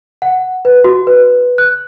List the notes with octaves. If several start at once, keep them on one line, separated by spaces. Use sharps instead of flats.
F#5
B4
F#4
B4
F#6